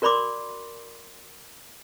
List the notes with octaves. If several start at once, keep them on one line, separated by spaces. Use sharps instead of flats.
F#4 A#4 D5 B5 C6 D6